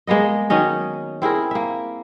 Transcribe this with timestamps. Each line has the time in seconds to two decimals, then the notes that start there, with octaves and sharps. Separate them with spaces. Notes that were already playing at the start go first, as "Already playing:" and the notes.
0.07 G#3 A#3 B3 D#5
0.50 D#3 F#3 C#4 D#5
1.22 C4 E4 G#4 A#4
1.51 A#3 E5